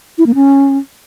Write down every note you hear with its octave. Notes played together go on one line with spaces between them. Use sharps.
E4
A#3
C#4